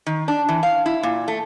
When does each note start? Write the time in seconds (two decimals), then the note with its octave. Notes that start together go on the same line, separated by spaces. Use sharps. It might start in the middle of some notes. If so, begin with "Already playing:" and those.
0.06 D#3
0.28 D4
0.49 E3
0.63 F5
0.86 E4
1.03 A#2
1.28 A3